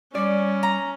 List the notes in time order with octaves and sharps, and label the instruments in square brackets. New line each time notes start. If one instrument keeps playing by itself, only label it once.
[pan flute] G3 [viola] C#4 [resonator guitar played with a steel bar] D5
[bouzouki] A#5